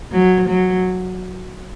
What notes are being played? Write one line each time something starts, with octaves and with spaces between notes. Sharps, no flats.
F#3
F#3